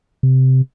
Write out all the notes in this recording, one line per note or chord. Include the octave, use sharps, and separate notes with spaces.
C3